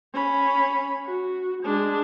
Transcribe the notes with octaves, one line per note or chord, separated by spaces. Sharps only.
C#4 B5
F#4
G#3 D4